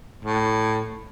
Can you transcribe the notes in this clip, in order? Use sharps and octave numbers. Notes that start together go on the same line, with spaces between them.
A2